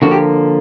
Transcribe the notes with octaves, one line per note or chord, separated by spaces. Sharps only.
D3 F3 A#3 F#4
G4